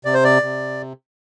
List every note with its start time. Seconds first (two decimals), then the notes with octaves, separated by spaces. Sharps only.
0.05 C3 D5
0.14 C5
0.24 D5
0.42 C3